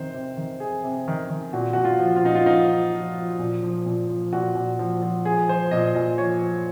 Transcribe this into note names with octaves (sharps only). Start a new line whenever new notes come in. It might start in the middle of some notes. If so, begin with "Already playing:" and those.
Already playing: C3 D#3 C5
C3
D#3
C3 G#4
C3
D#3
D#3
A#2 F#4
A#2 F#4
F4
F3
F4
A#2 D#4
F4
F3 D#4
F3
F3
F3
A#2
F3
A#2
F3
A#2 F#4
A#2
F3
F3
F3 G#4
F3 C5
A#2 D#5
A#2 D#5
F3 C#5
F3